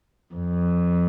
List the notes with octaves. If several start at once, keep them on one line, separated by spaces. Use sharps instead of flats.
F2